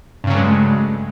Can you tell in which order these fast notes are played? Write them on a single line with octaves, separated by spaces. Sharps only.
G2 C#3 F#3 A3 G#3